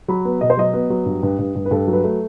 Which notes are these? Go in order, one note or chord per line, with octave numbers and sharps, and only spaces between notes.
F#3 B5
B3
B2 D#5
C5
F#3 D#5
B3
F#3
G2
G2
G2
G2
B4
G2 A4
F#3
B4
A3